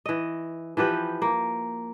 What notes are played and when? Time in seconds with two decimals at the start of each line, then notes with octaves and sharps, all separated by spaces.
0.06 E3 D#5
0.77 E3 F3 G4 B4
1.22 A#3